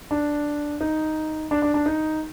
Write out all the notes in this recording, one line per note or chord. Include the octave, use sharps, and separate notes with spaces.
D4
D#4
D4
D4
D4
D#4